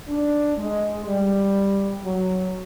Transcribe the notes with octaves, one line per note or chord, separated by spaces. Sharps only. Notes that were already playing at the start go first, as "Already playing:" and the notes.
D4
G#3
G3
F#3